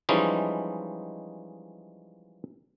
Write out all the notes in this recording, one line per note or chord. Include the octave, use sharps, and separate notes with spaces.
E3 F3 G3 G#3 C#4 D#4